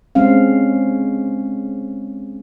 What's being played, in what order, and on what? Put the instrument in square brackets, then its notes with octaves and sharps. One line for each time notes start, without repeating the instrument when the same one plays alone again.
[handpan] G#3 C4 C#4 F5